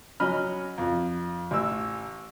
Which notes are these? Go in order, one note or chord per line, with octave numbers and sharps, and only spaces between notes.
F#3 C#4 D#5 B5 F6
F2
A1 E6